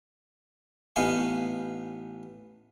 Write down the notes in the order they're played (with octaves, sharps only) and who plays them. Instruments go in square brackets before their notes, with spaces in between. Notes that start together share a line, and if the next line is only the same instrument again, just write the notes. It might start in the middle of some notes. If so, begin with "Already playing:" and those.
[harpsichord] A1 B3 D#4 F5 G#5 C#6